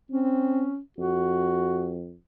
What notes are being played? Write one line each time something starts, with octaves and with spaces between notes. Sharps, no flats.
C4 C#4
F2 F#4